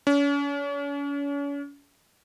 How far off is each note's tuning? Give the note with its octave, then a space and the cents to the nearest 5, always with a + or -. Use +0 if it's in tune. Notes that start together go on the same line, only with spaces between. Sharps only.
C#4 +40